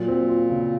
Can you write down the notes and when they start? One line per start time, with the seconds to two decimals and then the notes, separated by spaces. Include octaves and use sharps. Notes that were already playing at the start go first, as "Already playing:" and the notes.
Already playing: A#2 F#3
0.08 C4
0.29 F4
0.50 C#3